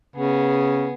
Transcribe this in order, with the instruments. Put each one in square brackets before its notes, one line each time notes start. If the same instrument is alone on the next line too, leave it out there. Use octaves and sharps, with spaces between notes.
[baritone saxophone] C#3 [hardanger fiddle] B3 G#4